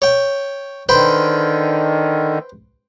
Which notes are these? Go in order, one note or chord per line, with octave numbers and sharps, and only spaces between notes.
C#5 G5
D3 D#3 B4 C5 G5